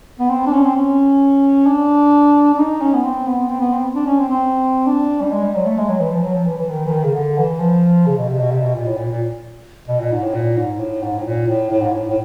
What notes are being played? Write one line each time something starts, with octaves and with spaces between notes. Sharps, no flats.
B3
C4
D4
C#4
C4
C#4
D4
D4
D#4
C#4
B3
C4
B3
C4
B3
C4
D4
C#4
C4
C4
D4
G3
G#3
G3
F#3
A3
G#3
F#3
E3
F3
F#3
F3
E3
E3
D#3
E3
D#3
C#3
D3
E3
F3
C#3
B2
C3
B2
C3
B2
A#2
A2
A#2
A#2
B2
A#2
G#2
A2
A#2
G#2
A2
G#2
A2
A#2
A2
A2
G#2
A2
A2